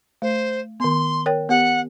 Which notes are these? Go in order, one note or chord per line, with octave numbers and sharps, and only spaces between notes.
A3 C5
D#3 B3 C6
A#4 C#5 G5
B3 G4 F#5